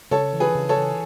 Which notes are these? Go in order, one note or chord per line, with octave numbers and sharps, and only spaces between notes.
C#3 A4 C#5
E3
G#4 B4
C#3
A4 C#5
E3